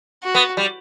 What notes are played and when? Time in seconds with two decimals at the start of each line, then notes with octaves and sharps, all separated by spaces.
0.23 F#4
0.35 B3
0.57 G3